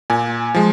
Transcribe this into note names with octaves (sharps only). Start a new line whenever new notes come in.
A#2 G#5
F3 G#3